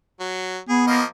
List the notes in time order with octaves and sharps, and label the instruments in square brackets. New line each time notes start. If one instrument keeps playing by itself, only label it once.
[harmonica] F#3
[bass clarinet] B3 [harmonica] G#4
[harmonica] F3 A#3 D#5